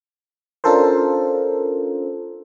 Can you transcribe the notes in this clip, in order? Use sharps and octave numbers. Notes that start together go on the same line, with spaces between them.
C#4 D4 F4 A4 A#4 C5